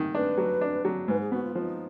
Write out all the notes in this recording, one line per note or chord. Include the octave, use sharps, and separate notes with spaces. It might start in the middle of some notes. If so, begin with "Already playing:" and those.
Already playing: D#3
D4 B4
F#3
D4
F#3
G#2 B4
G#4
B3 F#4
F4
F3 D#4